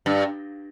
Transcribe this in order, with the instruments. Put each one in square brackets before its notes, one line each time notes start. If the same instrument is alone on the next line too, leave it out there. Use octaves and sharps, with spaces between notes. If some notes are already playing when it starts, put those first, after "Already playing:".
[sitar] G2